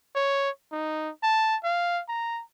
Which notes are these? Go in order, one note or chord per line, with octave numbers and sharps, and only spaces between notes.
C#5
D#4
A5
F5
A#5